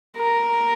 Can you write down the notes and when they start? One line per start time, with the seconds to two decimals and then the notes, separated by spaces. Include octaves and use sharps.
0.17 A#4